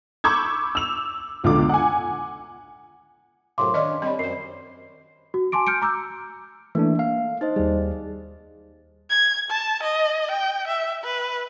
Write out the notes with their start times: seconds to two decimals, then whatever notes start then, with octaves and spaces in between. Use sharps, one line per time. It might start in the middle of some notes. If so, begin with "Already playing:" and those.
0.24 B5 C#6 D6 E6 G6 G#6
0.75 E6 F7
1.44 F1 C#2 B2 D3 F4 D6
1.69 F#5 G#5
3.58 F#2 A2 C3 F5 C6 D6
3.74 D#3 C#4 D4 D5 D#5
4.02 G3 C4 D#5 B5
4.19 F#2 C5 C7
5.34 F#4
5.52 G#5 A5 C6 D6 D7
5.67 F6 G6 C#7 D7
5.82 A#5 D6 E6 G6
6.75 E3 A3 A#3 D4
6.99 F5
7.41 D#4 C5 D#5
7.56 D#2 G3 G#4
9.10 G#6
9.50 A5
9.83 D#5
10.31 G5
10.68 E5
11.04 B4